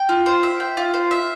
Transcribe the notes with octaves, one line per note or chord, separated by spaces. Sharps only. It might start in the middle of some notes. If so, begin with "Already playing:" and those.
Already playing: G5
F4
C5
E5
G5
F4
C5
E5